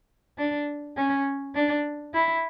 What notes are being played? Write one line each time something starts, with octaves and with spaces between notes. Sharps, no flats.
D4
C#4
D4
E4